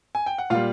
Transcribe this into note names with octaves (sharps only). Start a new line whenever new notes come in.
G#5
G5
F#5
A#2 G3 F4 F5